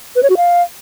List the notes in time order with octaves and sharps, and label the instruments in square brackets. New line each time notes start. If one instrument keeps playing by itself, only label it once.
[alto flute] B4
C#5
F#4
F5